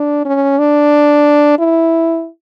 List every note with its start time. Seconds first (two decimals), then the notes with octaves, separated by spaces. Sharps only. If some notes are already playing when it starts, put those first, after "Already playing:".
Already playing: D4
0.25 C#4
0.59 D4
1.59 E4